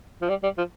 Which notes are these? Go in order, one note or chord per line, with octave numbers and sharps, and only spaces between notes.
F3
G3
G3
F3